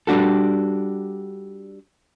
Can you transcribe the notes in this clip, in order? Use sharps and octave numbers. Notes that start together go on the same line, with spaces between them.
G3 D4 F#4 A4